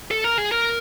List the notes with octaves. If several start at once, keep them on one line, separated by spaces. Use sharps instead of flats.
A4
A#4
G#4
A#4